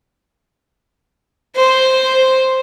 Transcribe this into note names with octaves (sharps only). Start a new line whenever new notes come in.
C5